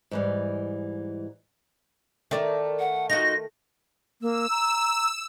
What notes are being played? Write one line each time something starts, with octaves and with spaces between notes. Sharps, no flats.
G#2 E3 G3
D#3 A3 A#4 D5 E5
F#5
D#4 F4 F#4 D#5 A#6
A#3 E6
A#5